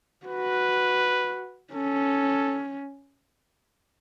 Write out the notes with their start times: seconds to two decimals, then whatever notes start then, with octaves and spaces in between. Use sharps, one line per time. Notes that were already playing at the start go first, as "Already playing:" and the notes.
0.27 F#4 B4
1.74 C#4 A4